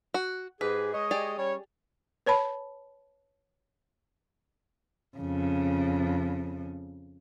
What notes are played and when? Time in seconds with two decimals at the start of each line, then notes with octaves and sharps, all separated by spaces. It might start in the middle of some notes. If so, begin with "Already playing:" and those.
0.14 F#4
0.61 G#2 G4 G#4 B4
0.94 G#3 C#5 D#5
1.11 G4 G#4 D5
1.38 G3 C#4 C#5
2.26 B4 C#5 A5 B5
5.18 F2 C#3